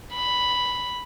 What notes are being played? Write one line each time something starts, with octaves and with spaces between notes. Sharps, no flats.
B5